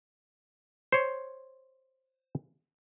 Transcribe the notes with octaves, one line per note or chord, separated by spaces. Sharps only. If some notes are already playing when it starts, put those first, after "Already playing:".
C5 C#5